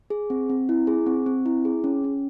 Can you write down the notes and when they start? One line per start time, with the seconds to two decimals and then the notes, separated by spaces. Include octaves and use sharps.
0.10 G#4
0.30 C4
0.50 C4
0.69 E4
0.87 G#4
1.06 C4
1.26 C4
1.46 E4
1.65 G#4
1.84 C#4
2.04 C#4